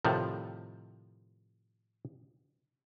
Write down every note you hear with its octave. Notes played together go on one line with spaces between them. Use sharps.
A2 C3 D#3 F3